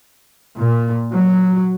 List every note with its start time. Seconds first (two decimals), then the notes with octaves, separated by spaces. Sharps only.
0.57 A#2
1.12 F#3